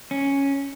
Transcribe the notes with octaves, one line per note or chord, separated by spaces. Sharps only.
C#4